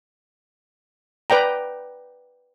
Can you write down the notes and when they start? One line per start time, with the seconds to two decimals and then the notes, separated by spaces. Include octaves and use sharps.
1.30 B4 D5 G5 A#5